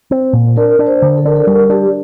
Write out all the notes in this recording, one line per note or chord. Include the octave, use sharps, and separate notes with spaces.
C4
A#2
D4 A#4
D4
C5
D3
A4
D4 A#4
A4
G3 A#4
D4 G4